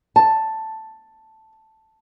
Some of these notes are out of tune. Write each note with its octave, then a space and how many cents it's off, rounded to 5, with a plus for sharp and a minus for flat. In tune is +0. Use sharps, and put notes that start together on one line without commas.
A5 +5